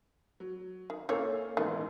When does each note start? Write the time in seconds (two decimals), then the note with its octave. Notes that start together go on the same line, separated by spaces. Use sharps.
0.40 F#3
0.90 D#3
1.09 A#3 C#4 E4 A4 C#5 F5
1.57 A1 D#3 G#3 B3 D#4